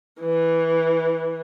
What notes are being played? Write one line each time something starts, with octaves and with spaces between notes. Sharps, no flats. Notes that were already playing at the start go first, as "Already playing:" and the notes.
E3